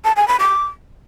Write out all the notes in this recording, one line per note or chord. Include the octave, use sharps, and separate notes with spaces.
A5
G#5
B5
D6